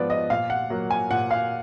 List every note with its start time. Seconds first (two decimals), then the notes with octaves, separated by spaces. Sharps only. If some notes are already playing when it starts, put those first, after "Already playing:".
Already playing: G#2 F3 B3 B4 D5
0.10 D#5
0.30 A#2 F5
0.50 F#5
0.70 F#3 A#3
0.91 G#5
1.11 A#2 F#5
1.31 F5